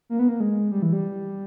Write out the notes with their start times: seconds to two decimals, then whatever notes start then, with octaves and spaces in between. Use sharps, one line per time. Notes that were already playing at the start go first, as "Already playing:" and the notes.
0.10 A#3
0.19 B3
0.29 A#3
0.40 G#3
0.71 G3
0.82 E3
0.93 G3